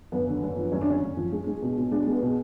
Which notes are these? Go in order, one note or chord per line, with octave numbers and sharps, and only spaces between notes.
F#2 B3
D3
F#2
F3
F#2 C#4
D4
D3 C#4
F#2
F3
G#3
G#3
B2
B2
G#3 D4
G#3 B3
B2